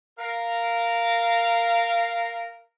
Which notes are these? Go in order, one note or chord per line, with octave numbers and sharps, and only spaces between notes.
A#4 F5